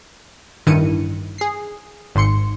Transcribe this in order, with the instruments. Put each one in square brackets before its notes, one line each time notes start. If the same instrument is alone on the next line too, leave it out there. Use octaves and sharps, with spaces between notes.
[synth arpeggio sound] A1 G2 D#3 E4 C#7 D#7
G#4 C7
G#1 G#2 C6 C#7